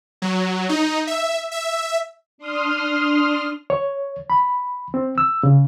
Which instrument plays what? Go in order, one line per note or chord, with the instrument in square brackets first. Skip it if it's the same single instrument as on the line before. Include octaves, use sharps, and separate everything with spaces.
[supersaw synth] F#3
D#4
E5
E5
[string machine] D4 C6 D#6 F6
[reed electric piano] C#5
B5
C4
E6
C#3